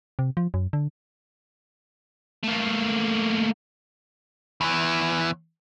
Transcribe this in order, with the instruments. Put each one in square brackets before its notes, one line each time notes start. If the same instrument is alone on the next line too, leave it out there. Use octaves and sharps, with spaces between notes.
[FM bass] C3
F3
F#2
D3
[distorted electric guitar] A3 A#3
[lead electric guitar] E2 E3